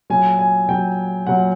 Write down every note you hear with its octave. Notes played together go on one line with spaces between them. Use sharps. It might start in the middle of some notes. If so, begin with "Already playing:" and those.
A#2 F#3 G#5
G#5
A#2 F#3 G5
A#2 F#3 F#5